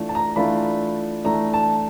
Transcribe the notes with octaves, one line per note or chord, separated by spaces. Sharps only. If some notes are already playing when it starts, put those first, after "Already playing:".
Already playing: E3 A3 D4 F4
A5
A#5
E3 A3 D4 F4 B5
E3 A3 D4 A#5
A5